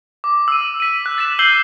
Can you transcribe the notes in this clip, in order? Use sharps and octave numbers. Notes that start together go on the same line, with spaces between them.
D6
E6 D#7
B6 D#7
F#6
E6 A6 B6 E7
E6 G6 C7 D#7 F#7 G7